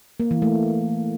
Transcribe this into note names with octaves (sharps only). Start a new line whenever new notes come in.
A#3
E3
A3